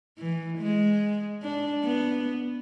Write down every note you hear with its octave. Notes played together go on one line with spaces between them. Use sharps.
E3
G#3
D4
B3